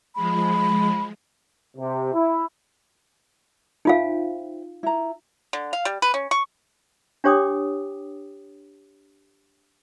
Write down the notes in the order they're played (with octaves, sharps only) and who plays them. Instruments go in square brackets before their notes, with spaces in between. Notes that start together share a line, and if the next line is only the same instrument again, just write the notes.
[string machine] F3 G#3 [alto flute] B5
[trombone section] C3
E4
[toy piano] D#4 F4 F5 [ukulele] C5 E5 G5
[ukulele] E4 A#5
[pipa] D3
F5
G3
B4
C#4
C#6
[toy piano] D4 G4 C#5 G5 D6 D#6